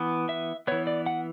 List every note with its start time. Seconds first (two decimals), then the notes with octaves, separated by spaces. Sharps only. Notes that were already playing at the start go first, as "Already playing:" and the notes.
Already playing: E3 B3
0.29 E5
0.67 E3 B3 C#5
0.87 D5
1.06 F#5